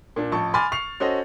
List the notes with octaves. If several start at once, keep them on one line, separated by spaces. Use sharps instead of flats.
A#2 D4
A1 F3 A5 C#6
G#5 B5 C6 D6 F6 A6
C#6 C7 F7
C#4 F#4 A4 C5 D#5